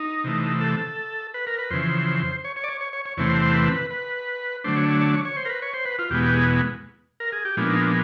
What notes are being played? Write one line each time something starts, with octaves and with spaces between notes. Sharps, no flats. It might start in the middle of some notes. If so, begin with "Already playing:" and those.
Already playing: D#4
C3 E3 A3
A4
B4
A#4
B4
F2 C#3 E3 C5
C#5
C#5
D5
C#5
C#5
C#5
C#5
E2 C3 E3 A3 C4 C#5
C5
C5
B4
B4
D3 F#3 A3 D4 C5
C#5
C#5
C#5
C#5
C#5
C5
A#4
B4
C#5
C5
B4
F4
E2 B2 G#3 B3 G4
G4
G#4
A#4
G#4
G4
A#2 F3 G#3 B3 D4
D#4
D4